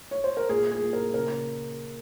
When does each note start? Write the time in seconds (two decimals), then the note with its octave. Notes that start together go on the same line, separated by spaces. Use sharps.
0.11 C#5
0.24 C5
0.37 A#4
0.49 A#2 G#4
0.71 G#4
0.82 A#2
0.93 A#4
1.14 C#3 A#4